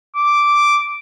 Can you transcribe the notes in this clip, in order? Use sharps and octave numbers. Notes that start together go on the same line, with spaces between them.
D6